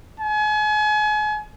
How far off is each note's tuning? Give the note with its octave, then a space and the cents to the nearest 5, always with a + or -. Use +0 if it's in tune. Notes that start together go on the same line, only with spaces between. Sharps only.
G#5 +35